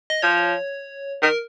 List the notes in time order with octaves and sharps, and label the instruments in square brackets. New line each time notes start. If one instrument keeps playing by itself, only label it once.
[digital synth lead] D#5
[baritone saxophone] F3 [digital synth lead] C#5
[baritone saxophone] D#3 [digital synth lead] A#4